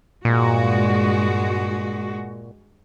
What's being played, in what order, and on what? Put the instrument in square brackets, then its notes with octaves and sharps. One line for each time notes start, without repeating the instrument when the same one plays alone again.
[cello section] G2 G#3 F#4 [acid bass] A#2